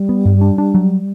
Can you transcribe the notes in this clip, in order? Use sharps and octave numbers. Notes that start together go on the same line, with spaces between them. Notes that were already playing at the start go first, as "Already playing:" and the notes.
Already playing: G3
B3
G2
D4
D4
F#3